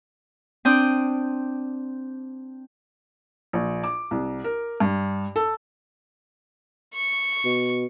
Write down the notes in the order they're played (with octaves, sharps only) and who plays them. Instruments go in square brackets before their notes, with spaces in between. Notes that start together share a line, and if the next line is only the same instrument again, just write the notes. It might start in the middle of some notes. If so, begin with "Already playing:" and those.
[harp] C4 D4 D#6 G6
[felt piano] A#1
D6
C2
A#4
G2
A4
[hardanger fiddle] C#6
[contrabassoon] B2